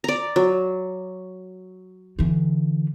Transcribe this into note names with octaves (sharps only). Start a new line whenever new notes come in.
D5 A#5
F#3
D3 E3